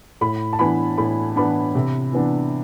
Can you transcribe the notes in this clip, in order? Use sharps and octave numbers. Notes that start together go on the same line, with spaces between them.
A2 B5
A5
E3 B3 D4 B5
A2 B5
E3 B3 D4 B5
C3
E3 B3 D4